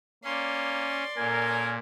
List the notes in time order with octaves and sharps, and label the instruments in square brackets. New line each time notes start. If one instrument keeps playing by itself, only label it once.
[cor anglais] A#3 [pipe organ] C#4 [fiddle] D5 C6
[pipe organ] A#2 [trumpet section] C#4 A4 A#4 [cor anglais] G#5